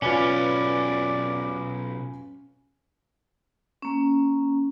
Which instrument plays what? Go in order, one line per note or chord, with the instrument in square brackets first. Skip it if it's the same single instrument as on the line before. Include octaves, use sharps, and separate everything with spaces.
[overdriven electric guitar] B1 E4 [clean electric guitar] C#4 [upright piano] F4 B4 G#5 [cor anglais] D5
[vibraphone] A#3 C#4